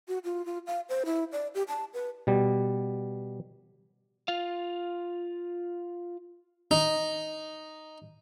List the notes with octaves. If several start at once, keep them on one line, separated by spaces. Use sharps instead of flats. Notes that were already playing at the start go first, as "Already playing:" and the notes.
F#4
F4
F4
F5
C5
E4
D5
G4
A5
B4
B2 G3
F4 F5
D#4